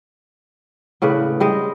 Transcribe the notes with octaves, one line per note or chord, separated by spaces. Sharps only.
A2 C#3 D4 B4
G3 G#3 D#5